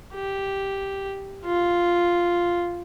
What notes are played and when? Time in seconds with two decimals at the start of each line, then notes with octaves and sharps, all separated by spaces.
0.14 G4
1.45 F4